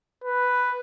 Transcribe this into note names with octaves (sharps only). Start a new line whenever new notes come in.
B4